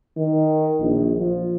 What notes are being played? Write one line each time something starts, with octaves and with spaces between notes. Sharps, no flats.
D#3
A#1
F3